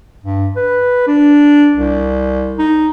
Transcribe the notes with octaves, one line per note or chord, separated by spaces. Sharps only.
G2
B4
D4
C2
D#4